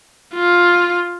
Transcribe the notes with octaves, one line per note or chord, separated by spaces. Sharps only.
F4